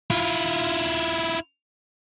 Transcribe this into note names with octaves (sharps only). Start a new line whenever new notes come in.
E4 F4